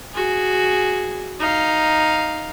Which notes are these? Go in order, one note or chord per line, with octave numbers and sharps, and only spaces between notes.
F#4 G#4
D#4 F5